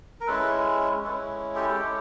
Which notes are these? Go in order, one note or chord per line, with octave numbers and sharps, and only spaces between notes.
A#4
G#3 C#4 E4 A4 B4
G#3 C#4 E4 A4 B4
G4 A4
G#3 C#4 E4